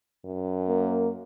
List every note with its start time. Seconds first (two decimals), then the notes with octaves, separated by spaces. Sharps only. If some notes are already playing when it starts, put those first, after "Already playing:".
0.25 F#2
0.68 A#3